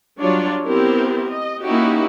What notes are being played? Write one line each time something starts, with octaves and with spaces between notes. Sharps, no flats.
F#3 G3 D4 F4 C#5 D5
B3 C4 E4 G4 A#4 C5
D#5
A#3 C#4 D#4 E4 F#4 G4